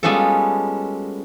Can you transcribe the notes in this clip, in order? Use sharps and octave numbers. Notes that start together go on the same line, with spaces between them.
G3 G#3 B3 C#4 F4 A4